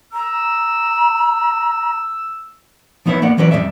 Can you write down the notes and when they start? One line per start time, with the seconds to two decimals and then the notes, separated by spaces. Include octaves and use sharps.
0.13 A#5 E6
3.06 F3 B3 D#4 E4 B4 C#5
3.22 A#3 B3 D5 F#5
3.37 E3 F#3 C#4 B4 C5 D5
3.51 F2 E3 G3 D5 E5